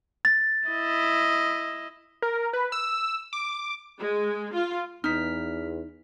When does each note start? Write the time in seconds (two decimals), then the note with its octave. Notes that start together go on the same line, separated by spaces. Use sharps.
0.25 A6
0.68 E4 D#5
2.22 A#4
2.53 B4
2.72 E6
3.33 D6
3.99 G#3
4.54 F4
5.04 E2 D#4 F6 B6